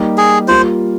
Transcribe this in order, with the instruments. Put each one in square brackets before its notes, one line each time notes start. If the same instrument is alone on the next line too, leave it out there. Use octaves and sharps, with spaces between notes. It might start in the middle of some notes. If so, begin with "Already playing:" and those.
Already playing: [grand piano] G3 A#3 D#4 G4
[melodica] G#4
[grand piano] G3 A#3 F4 [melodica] C5